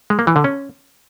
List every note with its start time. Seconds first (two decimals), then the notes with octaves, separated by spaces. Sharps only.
0.10 G#3
0.19 A#3
0.27 E3
0.36 D3
0.44 C#4